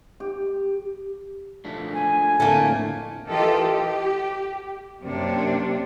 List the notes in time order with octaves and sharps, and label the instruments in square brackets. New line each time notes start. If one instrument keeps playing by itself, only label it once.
[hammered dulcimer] G4
[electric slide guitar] F3 A3 D4
[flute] G#5
[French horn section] F2 A2 D3 [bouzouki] A3 A#3
[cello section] E3 F4 G4 A4 A#4 D#5
G4
F#2 C3 A#3 C4 D4